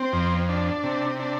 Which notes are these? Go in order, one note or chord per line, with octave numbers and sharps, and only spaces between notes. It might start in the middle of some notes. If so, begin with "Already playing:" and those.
Already playing: C4
F2
D4
C3
D4